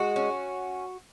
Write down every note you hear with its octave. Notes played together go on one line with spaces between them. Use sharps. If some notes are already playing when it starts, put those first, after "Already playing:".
Already playing: G#3 F#4
C#4